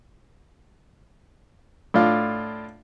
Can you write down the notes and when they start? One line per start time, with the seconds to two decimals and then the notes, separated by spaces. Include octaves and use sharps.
1.94 A2 D4 F4